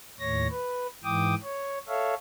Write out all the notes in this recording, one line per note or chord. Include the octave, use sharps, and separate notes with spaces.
D#2 A2 C#5 A#6
B4
G#2 E3 G5 D6 D#6
C#5
A4 C#5 E5 F5